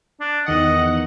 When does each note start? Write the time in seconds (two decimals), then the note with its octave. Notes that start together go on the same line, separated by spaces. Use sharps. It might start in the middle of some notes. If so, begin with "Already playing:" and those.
0.20 D4
0.46 E2 D#3 D#5 F#5